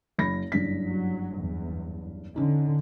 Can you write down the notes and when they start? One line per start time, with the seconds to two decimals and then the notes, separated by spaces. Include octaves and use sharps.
0.18 F#1 B5 A#6
0.52 F#1 G2 B6
0.87 F#3
1.38 E2
2.36 D3 C#4 D#4